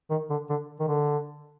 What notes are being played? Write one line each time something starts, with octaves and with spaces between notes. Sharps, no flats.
D#3
D3
D3
D#3
D3